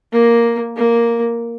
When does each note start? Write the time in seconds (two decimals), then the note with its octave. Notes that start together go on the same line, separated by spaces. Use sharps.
0.13 A#3
0.76 A#3